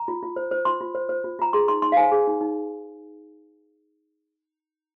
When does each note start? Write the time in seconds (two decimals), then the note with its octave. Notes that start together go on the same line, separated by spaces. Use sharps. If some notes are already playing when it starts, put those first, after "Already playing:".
Already playing: A#5
0.08 F4
0.23 F4
0.36 C5
0.51 C5
0.65 F4 C6
0.81 F4
0.95 C5
1.09 C5
1.24 F4
1.39 F4 A#5
1.53 G#4 C6
1.68 D#4 C6
1.82 D#4 C6
1.92 F5
1.97 C5 G#5
2.12 G#4
2.27 D#4
2.41 D#4